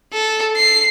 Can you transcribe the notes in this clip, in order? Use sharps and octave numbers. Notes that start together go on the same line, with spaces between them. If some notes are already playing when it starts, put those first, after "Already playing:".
A4
C7